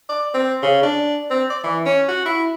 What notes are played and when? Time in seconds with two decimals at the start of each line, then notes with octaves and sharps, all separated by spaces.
0.09 D5
0.34 C4
0.63 C#3
0.83 D4
1.30 C4
1.50 D5
1.64 E3
1.86 C#4
2.08 F#4
2.26 E4